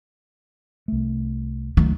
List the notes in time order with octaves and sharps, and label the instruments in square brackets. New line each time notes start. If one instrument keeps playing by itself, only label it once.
[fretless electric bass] C2 A3
[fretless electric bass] C#2 F#3 A3 [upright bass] D#3